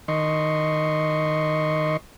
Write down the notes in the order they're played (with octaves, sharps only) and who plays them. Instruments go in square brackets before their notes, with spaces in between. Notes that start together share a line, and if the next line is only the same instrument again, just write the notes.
[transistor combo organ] D#3 D#5 C6 C#6